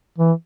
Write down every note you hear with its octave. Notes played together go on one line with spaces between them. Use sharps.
E3